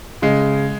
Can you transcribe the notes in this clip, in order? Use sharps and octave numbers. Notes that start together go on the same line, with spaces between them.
C#3 G#3